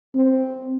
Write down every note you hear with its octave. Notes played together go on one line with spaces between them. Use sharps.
C4